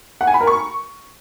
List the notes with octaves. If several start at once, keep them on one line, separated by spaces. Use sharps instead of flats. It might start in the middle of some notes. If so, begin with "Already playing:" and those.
F#5
G#5
B5
A#4
C#6